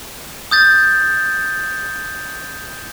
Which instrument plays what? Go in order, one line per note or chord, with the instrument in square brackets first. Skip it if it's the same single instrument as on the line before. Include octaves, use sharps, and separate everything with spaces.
[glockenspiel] D#6 G6 A6